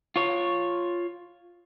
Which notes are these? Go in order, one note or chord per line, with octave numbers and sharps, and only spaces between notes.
F4 C#5